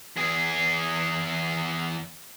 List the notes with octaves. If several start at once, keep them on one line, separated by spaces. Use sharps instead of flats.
E2 G#4